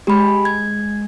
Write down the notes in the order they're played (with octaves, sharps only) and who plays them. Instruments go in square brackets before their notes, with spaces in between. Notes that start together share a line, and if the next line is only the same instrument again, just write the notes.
[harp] G#3 [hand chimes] G4 B5
[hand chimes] G#6